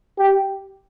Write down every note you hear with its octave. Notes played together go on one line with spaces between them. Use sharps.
G4